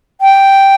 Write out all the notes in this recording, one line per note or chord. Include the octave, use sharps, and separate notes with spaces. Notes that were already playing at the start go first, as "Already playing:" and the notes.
G5